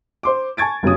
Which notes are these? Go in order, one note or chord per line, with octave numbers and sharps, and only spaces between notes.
C5 C6 D6
G#5 A5 C#6 G#6 A6 D7
F#1 G2 F#3 C#4 D#6